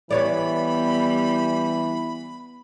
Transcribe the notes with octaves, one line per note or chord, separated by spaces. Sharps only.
E3 G3 B3 C#5 D5 B5